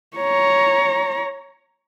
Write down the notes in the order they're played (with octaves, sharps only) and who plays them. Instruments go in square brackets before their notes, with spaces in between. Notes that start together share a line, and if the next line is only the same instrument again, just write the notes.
[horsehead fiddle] C#5 A#5